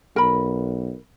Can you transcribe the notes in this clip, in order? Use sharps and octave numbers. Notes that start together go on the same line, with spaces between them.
B1 A#4 B5